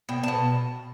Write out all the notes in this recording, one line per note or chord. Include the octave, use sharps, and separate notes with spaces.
B2 G5
B2 A5